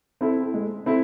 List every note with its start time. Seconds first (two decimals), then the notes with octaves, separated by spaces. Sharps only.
0.21 C4 E4 A4
0.54 G#3
0.86 C4 E4 A4